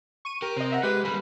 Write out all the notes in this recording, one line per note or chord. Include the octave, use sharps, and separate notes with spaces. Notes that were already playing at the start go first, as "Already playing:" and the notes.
C#6 D#7
G4 A#4
C3 C5 D#5
D#5 E5 F#5
G#3 G4 B4
G3 G#3 A#3 B5